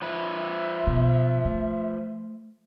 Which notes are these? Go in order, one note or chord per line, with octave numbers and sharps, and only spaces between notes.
F3 B4 E5
B2
A3